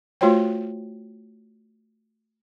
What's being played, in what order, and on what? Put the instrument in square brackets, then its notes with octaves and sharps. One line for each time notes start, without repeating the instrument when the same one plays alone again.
[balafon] A3 F4 F#4 C5 C#5 G5